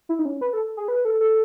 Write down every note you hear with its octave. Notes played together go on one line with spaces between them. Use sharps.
E4
D#4
C#4
B4
A4
G#4
B4
A4
A4